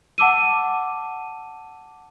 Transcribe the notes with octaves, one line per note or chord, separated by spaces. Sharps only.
F#5 A5 D6 E6 D#7